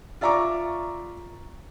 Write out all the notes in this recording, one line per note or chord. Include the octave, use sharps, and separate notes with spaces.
F4 D5 E5 A#5 C#6 D6